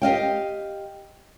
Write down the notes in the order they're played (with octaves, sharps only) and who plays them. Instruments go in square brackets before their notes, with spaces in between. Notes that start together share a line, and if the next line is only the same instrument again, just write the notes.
[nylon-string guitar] G4 D#5 F5 G5